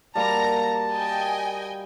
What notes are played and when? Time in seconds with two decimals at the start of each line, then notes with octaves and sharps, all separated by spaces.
0.15 G3 A#3 F#4 A5 A#5
0.92 D#5 G5 G#5